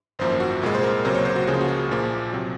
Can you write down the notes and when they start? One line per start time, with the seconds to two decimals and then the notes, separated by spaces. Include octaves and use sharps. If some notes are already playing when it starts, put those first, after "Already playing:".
0.19 G#1 F#2 F3 A#3 C5
0.40 F#4
0.62 C2 A#2 G#3
0.75 C5
0.83 A#4
1.05 C#2 C3 F#3 A#3 C5
1.15 C#5
1.25 C5
1.36 F#4
1.47 C#2 C#3 F3 A#3 G#4
1.54 F4
1.61 F#4
1.68 G#4
1.89 A#1 A#2 F3 A#3
2.32 C3 F#3